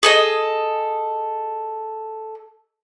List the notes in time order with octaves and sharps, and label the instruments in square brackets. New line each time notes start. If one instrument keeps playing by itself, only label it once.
[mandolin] G#4 A4 D#5